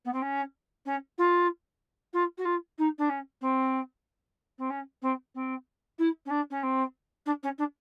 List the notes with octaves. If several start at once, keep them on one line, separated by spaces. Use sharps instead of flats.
B3
C4
C#4
C#4
F4
F4
F#4
F4
D#4
D4
C#4
C4
C4
C#4
C4
C4
E4
C#4
D4
C#4
C4
D4
C#4
D4